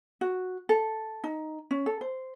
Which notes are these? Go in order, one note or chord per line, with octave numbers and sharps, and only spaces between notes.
F#4
A4
D#4
C#4
A4
C5